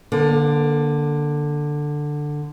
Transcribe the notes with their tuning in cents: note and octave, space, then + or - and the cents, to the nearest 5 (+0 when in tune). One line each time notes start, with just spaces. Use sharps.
D3 +10 A#3 +30